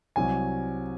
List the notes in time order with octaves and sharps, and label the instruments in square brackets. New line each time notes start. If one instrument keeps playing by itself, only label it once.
[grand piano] C2 C3 F#3 G#5